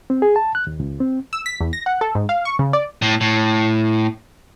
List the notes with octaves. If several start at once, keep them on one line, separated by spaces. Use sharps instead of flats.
C4
G#4
A5
F#6
D#2
C#2
C4
E6
B6
E2
A#6
F#5
A4
G#2
F5
C#6
C#3
D5
A2
A2